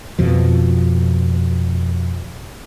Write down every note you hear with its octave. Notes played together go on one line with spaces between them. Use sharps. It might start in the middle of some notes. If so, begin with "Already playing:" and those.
F2 B2 F3